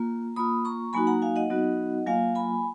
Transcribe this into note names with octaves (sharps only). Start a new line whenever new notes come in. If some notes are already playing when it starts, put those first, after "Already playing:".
Already playing: A#3 F4 A#5
A#3 F4 B5 D#6
A#5 C#6
F#3 A#3 D#4 F#4 G#5 B5
F#5 A#5
F5 G#5
D#5 F#5
F#3 B3 D#4 F#4
F#3 A#3 F4 F5 G#5
G#5 B5